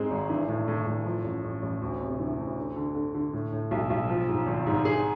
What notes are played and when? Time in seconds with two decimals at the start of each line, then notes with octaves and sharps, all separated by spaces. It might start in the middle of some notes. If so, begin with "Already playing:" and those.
Already playing: G#2 G#3 C4
0.11 G#1
0.30 E3
0.48 A2
0.68 A2
0.87 A2
1.06 F3
1.24 A1
1.44 A1
1.62 A1
1.82 D2
2.01 C3
2.20 E3
2.38 D2
2.57 D3
2.76 D3
2.95 D3
3.14 D3
3.33 A2
3.52 A2
3.71 B1
3.90 B1
4.10 F3
4.28 G#2
4.47 G#1
4.66 G#2
4.85 G#4